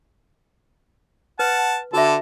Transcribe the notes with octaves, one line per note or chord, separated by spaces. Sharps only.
B4 F#5 A5
D3 F#4 A4 E5 A5